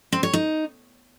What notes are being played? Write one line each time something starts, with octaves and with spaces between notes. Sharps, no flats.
C4
C#5
D#4